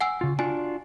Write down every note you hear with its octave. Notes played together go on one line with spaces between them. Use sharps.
F#5 G#5 E6
C#3 F4
D4 F4 F#4 G#5